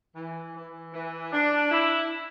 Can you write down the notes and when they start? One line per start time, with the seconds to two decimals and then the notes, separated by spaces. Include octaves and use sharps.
0.16 E3
0.55 E3
0.93 E3
1.33 D4
1.72 E4